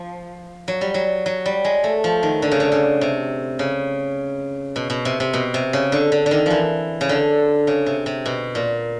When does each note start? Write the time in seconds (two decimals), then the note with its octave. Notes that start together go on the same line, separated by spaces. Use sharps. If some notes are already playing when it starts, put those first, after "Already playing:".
Already playing: F3
0.68 F#3
0.81 G3
0.94 F#3
1.26 F#3
1.46 G3
1.65 G#3
1.84 A3
2.04 F3
2.23 D#3
2.42 D3
2.51 C#3
2.60 D3
2.72 C#3
3.01 C3
3.59 C#3
4.76 B2
4.90 B2
5.05 C3
5.20 C3
5.33 B2
5.54 C3
5.73 C#3
5.92 D3
6.12 D3
6.26 D3
6.31 D#3
6.46 E3 F3
7.01 C#3
7.09 D3
7.67 C#3
7.86 C3
8.06 C3
8.26 B2
8.55 A#2